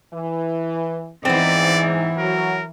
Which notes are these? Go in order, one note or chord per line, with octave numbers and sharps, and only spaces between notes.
E3
G#2 E3 B3 C4 D5
F#3 F#4 A#4